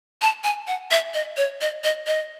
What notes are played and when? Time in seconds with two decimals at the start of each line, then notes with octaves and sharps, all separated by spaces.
0.22 A5
0.44 G#5
0.67 F#5
0.91 E5
1.14 D#5
1.37 C#5
1.61 D#5
1.84 D#5
2.07 D#5